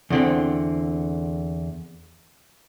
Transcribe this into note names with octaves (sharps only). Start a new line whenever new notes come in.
E2 D3 C4